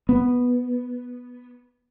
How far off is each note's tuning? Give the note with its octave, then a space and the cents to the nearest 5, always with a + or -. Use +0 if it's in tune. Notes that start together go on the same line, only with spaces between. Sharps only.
B3 -5